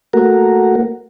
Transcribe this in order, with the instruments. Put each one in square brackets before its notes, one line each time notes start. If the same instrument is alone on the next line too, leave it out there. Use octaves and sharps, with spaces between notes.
[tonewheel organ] A3 A#3 F#4 A#4